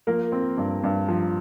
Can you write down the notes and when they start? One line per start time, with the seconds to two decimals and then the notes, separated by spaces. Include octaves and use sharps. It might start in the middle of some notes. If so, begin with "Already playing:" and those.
0.07 F3 A#3 A#4
0.32 C4
0.58 G2
0.84 G2
1.08 F3